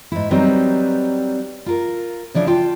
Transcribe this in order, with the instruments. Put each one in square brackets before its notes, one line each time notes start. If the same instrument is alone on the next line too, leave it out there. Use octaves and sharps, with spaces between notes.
[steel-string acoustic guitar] G#2 E4
F#3 G3 C4 D#4 B4
F4 A#4
C#3 F3 D4 E4
F4 G5 A5